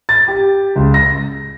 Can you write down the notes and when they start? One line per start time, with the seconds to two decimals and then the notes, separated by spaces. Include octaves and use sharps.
0.09 A6
0.28 G4
0.76 C#2
0.94 A#6